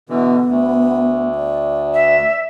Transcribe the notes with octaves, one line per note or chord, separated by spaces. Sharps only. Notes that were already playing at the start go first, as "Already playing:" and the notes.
B2 D3 E3 B3
D2
D5
E5